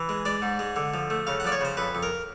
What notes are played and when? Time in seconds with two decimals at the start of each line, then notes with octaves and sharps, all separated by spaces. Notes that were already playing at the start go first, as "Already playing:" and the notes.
Already playing: E3
0.09 G#3
0.25 G#3 D5
0.42 G#2
0.59 G#3
0.76 D3
0.94 F3
1.10 A3
1.27 C#3 F5
1.40 F#5
1.44 F3 D5
1.52 C#5
1.61 C#3 C5
1.77 F2 B4
1.95 F2
2.03 A#4